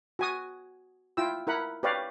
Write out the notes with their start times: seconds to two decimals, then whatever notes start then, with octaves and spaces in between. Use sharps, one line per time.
0.19 F#4 G#5 D#6
1.17 E4 F4 G5 E6
1.47 E4 A#4 F#5 B5
1.83 G4 B4 C#5 D5 F5